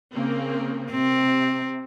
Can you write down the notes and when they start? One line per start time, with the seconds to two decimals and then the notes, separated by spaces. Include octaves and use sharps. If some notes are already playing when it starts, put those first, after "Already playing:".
0.12 C#3 A#3 C4
0.91 C3 C4